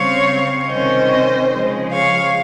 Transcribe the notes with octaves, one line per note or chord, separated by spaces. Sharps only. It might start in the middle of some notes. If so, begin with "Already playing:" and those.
Already playing: C#3 G3 C4 C#5 F5
C3 D#3 G3 C#4 C5 D#5
C#3 F3 G#3
C#5 F5